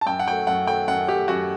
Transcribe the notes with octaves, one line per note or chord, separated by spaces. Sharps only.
A5
F#2 G5
F#5
F#3 A3 G5
F#2 F#5
F#3 A3 G5
F#2 F#5
F#3 A3 G4
F#2 F#4